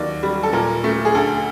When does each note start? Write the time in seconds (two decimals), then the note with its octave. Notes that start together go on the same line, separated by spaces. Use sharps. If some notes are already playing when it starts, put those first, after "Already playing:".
Already playing: D#2 F#3 D5
0.23 G3
0.43 A4
0.53 A#2 A#4
0.84 A3
1.05 G#4
1.15 D2 A4